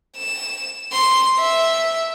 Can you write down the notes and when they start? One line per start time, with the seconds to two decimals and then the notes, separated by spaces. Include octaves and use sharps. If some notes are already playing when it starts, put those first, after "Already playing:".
0.17 E7
0.92 C6
1.39 E5